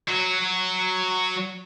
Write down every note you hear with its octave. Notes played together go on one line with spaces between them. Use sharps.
F#3 F#4